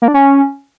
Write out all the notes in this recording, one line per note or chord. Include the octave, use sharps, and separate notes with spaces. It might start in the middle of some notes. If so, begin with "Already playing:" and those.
A#3
D4
C#4